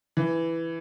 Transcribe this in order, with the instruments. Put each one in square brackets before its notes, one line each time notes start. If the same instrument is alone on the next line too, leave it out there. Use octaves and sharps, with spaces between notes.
[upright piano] E3